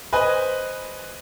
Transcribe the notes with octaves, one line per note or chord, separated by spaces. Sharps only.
B4 C5 D#5 G#5